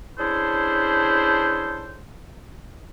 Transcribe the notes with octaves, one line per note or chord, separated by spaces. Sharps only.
C#4 D4 E4 G#4 A4 C5